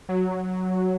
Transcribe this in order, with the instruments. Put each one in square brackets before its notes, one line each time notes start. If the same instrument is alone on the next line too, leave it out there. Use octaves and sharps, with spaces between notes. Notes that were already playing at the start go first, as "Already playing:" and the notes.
[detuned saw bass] F#3